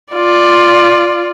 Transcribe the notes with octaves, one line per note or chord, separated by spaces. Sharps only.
F4 D5